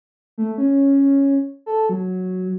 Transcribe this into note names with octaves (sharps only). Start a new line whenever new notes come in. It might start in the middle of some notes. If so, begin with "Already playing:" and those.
A3
C#4
A4
F#3